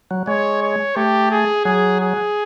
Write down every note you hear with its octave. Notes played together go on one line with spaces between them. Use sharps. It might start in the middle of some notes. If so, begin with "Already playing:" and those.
F#3
G#3 C#5
C#5
A3 G4
G#4
F#3 G#4
G#4